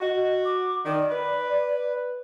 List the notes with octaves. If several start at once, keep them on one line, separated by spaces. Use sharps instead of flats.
F#4 D#5
D6
D#3 D5
B4